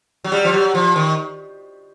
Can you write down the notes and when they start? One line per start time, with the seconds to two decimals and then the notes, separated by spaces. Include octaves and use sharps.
0.24 F#3
0.32 G3
0.45 F3
0.53 F#3
0.75 F3
0.96 D#3